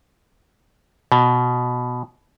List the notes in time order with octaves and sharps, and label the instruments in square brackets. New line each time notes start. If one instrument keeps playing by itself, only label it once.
[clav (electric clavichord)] B2